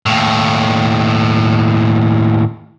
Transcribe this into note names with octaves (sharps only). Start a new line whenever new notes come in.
D#2 A2